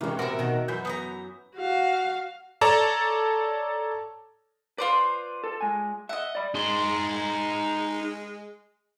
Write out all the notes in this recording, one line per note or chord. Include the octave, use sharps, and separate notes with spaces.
C3 D#3 E3 G#3 C#4
E2 A2 C3 F#4 A#4 E5
B2 D#3
F#2 E3 F#3 G6 B6
B3 A5 A#5
F#4 F5
A4 C#5 D5 A5 A#5
F4 B4 C5 D5
A4
G#3 G#5
D#5 E5 F#5
D5 B5
G#3 D#4 C6